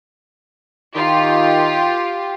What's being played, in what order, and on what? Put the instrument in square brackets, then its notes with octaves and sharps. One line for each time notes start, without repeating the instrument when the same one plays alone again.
[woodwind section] D#3 [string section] F4 G4